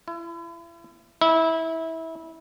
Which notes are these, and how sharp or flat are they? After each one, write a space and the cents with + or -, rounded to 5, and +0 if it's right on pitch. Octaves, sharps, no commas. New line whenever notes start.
E4 +40
E4 -20